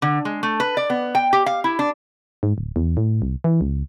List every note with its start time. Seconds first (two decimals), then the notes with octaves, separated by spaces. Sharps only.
0.02 D3
0.25 G#3
0.43 A3
0.60 B4
0.77 D5
0.90 B3
1.15 G5
1.33 G4
1.46 F5
1.64 E4
1.79 D4
2.43 G#2
2.58 D1
2.76 E2
2.97 A2
3.22 C2
3.44 E3
3.61 C#2